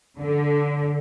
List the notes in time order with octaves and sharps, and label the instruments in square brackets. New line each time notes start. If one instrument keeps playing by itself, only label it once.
[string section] D3